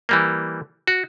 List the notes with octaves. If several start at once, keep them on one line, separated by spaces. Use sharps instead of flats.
E3 G3 A#3
F#4